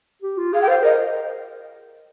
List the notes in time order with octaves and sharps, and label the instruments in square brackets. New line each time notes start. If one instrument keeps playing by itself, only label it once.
[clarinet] G4
F4
[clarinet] G#4 [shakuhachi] F5
[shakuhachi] G5
[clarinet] C5 [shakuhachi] F5
[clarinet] A#4 [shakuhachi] D#5